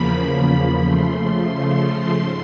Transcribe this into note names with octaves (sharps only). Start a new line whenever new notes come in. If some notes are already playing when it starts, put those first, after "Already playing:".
Already playing: E2 C#3 F3 A#3 B5
C#3 F3 A3 C6
G#2